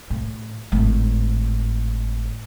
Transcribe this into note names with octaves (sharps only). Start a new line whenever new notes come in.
A2
G#1 A2